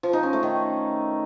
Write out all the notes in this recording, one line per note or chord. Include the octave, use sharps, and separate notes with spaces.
F3
D#4
C#4
A3
D#3